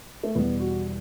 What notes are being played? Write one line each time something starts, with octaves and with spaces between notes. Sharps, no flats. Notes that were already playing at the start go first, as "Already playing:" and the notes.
A3
E2 B2 G3 B3
F#4